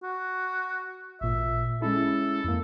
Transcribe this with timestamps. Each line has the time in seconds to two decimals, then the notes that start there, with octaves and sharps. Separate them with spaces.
0.03 F#4
1.21 A1 A#2 E5
1.82 G#3 C#4 E4 A4
2.44 F2 A#3